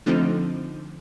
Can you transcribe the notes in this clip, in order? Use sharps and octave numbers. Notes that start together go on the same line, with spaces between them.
D3 F3 A3 C4 D#4